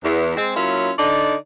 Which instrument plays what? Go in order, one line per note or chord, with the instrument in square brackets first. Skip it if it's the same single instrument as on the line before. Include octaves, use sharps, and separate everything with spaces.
[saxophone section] E2
G#3 C4
F#3 A#3 C#4 E4 F4
D3 D#4 D5